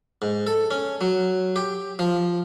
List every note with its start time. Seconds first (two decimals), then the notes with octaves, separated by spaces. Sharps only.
0.22 G#2
0.47 A4
0.71 C#4
1.01 F#3
1.56 G4
1.99 F3